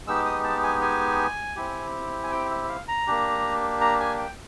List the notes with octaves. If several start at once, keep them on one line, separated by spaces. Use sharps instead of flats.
G#3 B3 D#4 G4 E6
D#6
A5
G#5
G#5
C4 E4 G4
G#5
G5
E5
E5
F5
A#5
A#3 D4 G4
A#5
G#5
G5